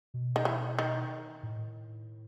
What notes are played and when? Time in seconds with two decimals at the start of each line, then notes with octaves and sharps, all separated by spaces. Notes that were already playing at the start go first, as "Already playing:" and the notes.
0.14 B2
0.36 D#3
0.45 E3
0.79 D#3
1.43 A2